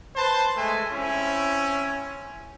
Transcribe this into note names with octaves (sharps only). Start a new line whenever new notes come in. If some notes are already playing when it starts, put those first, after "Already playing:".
B4 C5 A5
G#3 A3 G#5
C4 C#4 E4